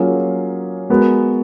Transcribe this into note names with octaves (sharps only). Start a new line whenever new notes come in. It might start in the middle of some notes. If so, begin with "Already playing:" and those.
Already playing: F#3 A#3 C#4 F4 G#4
G#3 B3 F#4 A#4